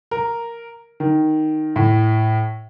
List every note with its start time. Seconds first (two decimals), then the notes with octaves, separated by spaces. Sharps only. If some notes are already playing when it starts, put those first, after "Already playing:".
0.11 A#4
1.00 D#3
1.76 A2